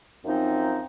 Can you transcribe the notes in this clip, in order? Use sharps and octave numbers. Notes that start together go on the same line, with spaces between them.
F#2 F3 C4 D#4